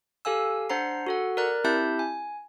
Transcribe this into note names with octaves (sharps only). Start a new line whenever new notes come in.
G4 A4 F5 G#5 E6
D4 C5 F#5 A#5 C7
F#4 A4 F#5
A#4 D5 A#5 F#6
C4 E4 G4 E5 A5 G6
G#5